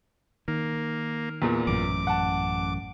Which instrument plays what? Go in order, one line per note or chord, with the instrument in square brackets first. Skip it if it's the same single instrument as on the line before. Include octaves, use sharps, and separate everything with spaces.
[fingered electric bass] D#3 [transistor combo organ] A#3
[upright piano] E2 A#2
[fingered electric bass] A1 F#2 [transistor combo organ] D6
[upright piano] F#5 A5